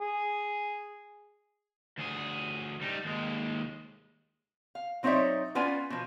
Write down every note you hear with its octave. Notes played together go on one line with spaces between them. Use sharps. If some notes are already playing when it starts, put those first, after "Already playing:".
G#4
D2 G#4
G3 D#4
D#2 G#3
F5
F#3 C4 D#4 C#5 D5 E5
B3 C#4 F4 B4 D5 G#5
B2 F3